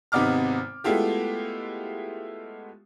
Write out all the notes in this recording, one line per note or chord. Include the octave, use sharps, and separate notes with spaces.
G#1 C3 B3 D#4 D6 F6
G#3 A3 B3 E4 F4 G4